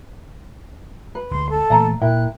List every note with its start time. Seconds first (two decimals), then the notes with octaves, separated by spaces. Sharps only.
1.15 B4
1.31 D2 G#3 C6
1.50 A4
1.70 A#2 E3 A3 F5 A#5
2.01 A#2 E4 A#4 G5 F#6